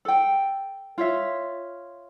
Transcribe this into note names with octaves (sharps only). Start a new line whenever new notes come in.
A4 G5
F4 C#5 E5